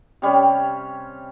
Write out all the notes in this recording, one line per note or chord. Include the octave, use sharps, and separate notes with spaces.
C3 G3 C#4